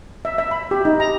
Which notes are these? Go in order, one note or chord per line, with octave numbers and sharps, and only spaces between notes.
E5
E5
B5
G4
D#4
A#5